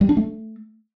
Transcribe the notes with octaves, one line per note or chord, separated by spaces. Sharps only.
G3
D4
A3